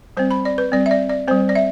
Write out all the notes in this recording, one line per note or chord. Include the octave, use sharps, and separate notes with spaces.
G3 C4 C5
B5
D5
B4
G3 C4 D5
E5
D5
D5
G3 C4 C5
D5
E5